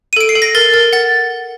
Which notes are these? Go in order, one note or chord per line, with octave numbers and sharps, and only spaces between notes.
D#7
A4 D7
C7
A4
A#6
A#4 A6
A#4
F#5 A6